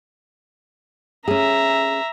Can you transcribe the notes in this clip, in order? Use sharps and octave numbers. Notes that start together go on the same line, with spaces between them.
C#4 G#4 E5 A#5